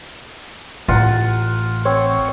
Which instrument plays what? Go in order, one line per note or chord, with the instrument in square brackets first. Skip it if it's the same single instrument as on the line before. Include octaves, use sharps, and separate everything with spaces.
[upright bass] A1 [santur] F4 F#5 A#5
[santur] C4 [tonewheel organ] C#5